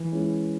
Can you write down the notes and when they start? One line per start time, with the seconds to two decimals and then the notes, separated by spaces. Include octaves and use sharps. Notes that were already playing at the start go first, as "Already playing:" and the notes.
Already playing: E3
0.12 G#3 C#4 E4